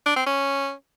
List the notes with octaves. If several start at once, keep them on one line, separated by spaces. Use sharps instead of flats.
D4
C4
C#4